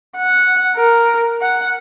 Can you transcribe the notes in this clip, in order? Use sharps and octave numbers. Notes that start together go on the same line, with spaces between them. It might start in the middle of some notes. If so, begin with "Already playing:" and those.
F#5
A#4
F#5